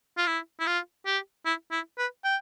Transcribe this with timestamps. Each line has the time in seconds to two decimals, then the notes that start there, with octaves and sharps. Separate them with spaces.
0.18 F4
0.27 E4
0.60 E4
0.67 F4
1.06 G4
1.45 E4
1.72 E4
1.98 B4
2.24 G5